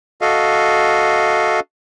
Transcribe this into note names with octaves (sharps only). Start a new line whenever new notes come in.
F#4 A4 D#5 F5